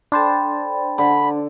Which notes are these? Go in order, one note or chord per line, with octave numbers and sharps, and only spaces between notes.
D4 A4 C5 G5 A5 B5
D3 B5